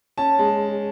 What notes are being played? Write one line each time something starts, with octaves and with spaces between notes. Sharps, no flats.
C#4 A5
G#3